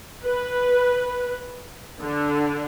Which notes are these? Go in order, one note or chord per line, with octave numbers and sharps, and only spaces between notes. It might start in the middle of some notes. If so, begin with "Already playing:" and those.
B4
D3